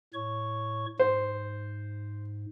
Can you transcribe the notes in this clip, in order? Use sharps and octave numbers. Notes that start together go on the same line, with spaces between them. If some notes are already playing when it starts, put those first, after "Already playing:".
A2 C#5 C#6
G#2 C5